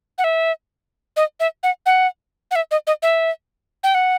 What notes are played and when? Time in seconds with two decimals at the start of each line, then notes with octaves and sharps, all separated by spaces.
0.18 F#5
0.24 E5
1.16 D#5
1.40 E5
1.63 F#5
1.86 F#5
2.51 F#5
2.55 E5
2.71 D#5
2.87 D#5
3.02 E5
3.83 G5
3.95 F#5